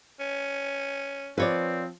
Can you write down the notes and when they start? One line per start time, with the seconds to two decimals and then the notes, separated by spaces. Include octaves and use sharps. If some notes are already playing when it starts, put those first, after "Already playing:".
0.20 C#4
1.38 F3 C4 B4 C#5 D5